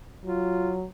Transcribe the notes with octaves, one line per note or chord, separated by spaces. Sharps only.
F#3 F4